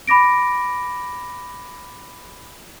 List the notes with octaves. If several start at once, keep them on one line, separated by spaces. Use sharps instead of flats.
B5 D6 A#6 D7